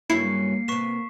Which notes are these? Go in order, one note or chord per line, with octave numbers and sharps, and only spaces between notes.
G2 C#3 F#3 A#3 E4 C7 C#7
C3 B3 C#6 B6 E7